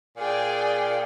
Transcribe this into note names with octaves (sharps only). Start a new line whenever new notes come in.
A#2 G#4 D5 G5